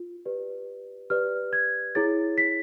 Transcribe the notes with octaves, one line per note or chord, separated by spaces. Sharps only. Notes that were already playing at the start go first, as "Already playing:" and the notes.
Already playing: F4
G4 B4 D5
G4 B4 D5 F6
G#6
E4 G#4 C#5 A6
B6